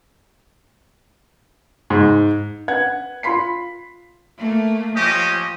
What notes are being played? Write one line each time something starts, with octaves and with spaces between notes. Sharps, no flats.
G#2
B4 F#5 G#6
F4 B5 C6 B6 C7
A3 A#3
F3 C#4 G4 D#5